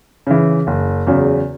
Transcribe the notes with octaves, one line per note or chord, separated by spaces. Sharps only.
C#3 E3
F#1
E2 C#3 F#3